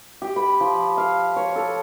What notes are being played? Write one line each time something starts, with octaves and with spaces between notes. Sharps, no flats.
G4
B5
F3
F5
C#5
A4